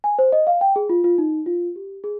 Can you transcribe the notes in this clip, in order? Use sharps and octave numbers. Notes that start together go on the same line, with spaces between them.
G#5
C5
D#5
F5
G5
G#4
F4
F4
D#4
F4
G4
G#4